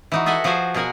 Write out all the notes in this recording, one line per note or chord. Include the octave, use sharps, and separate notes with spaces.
E3 D#4 F#4
G#4 A4 D#5 E5 F#5 G#5
F3 F#4 G#4 C5 G#5 A#5
B2 G#4 A#4 F#5 G#5